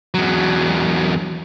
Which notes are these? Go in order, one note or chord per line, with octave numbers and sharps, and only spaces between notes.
E2 F#3